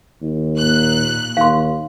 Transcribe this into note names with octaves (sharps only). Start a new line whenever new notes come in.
D#2
A#2 F#6
D#2 F5 C6